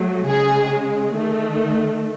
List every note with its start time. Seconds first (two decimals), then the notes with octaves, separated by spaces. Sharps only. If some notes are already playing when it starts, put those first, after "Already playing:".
Already playing: F#3 A3
0.27 C#3 G#3 G#4
1.15 D#3 A3